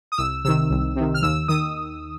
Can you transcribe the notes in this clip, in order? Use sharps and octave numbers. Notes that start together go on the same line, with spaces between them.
D#6
C2 E6
C3 D#3 E6
C2
C3 D#3
F6
D#2 E6
D#3 D#6